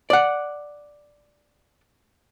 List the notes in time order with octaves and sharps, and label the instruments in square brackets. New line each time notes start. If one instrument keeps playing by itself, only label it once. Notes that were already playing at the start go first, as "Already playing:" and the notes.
[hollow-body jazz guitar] D5 F#5